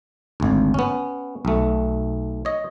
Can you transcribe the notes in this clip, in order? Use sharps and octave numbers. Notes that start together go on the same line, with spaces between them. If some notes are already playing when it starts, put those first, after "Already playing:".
G#1 D2
B3 C#4
B1 A3
C#5 D#5